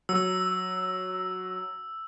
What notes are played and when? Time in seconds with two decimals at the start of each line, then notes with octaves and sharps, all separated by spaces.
0.09 F#3 E6